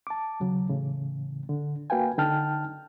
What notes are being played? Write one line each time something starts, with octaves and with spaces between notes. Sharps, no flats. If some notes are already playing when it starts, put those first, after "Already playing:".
A5 D6
D#2 C#3 F#3
A2 C#3 E3
D3
A#3 F#4 B4 F5 G5 G#5
D3 D#4 G5 A5 F6